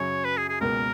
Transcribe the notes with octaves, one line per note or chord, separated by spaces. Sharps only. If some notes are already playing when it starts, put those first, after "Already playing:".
Already playing: F#2 C#3 F#3 C#5
B4
G#4
G#4
C#2 B2 A#3 A#4